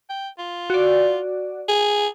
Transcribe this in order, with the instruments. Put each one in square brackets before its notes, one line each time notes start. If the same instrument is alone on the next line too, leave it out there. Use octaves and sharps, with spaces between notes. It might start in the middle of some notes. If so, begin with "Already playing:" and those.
[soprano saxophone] G5
F4
[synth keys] F#4 D5
[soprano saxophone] G#4